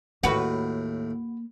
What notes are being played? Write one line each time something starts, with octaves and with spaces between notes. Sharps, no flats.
D#2 A2 A#3 F#4 B4